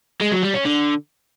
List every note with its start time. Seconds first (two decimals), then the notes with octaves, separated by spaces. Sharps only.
0.21 G#3
0.32 F#3
0.43 G3
0.54 C#4
0.65 D3